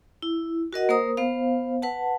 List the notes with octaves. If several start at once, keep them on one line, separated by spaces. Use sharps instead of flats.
E4
F#4 A#4 D#5 F#5
A#3 A#4 C5 A#5 D#6
B3 C5 F5
B4 F#5 A5